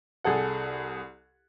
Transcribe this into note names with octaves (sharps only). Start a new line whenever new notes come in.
C2 G#4 A4 F#5